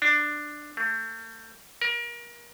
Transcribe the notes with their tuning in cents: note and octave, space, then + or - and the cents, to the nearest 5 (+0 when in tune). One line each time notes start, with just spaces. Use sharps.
D4 +10
A3 +35
A#4 +30